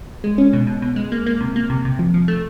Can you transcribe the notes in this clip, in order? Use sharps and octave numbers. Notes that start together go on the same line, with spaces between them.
G#3
C#4
B2
B2
B2
G#3
A#3
A#3
C3
A#3
C3
C3
F3
F3
A3